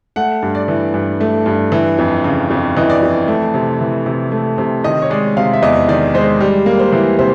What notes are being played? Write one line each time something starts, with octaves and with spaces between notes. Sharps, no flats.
A3 F#5
G2
D5
E3
G2
A3
G2
E3
F2
C#3
F2
E3 D#5
D5
F2
A3
C3
E3
C3
A3
C3
D#3 D#5
C#5
G#3 D5
C3 F5
E5
E2 D#5
D#3 D5
G#3 C5
G3
A#3
C5
E3
C3 C5